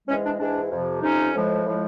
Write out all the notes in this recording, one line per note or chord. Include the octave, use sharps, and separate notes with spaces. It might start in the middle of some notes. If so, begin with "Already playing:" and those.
G#2 E3 G#3 C#4
D4
G#2 E3 G#3 D4
F2 C3 F3
F2 C3 F3 C#4 D#4
A2 F3 G#3
A2 F3 G#3